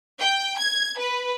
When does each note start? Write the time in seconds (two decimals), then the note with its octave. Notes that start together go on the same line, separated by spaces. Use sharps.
0.19 G5
0.58 G#6
0.99 B4